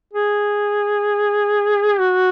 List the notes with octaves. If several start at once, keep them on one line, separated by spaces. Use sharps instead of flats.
G#4
F#4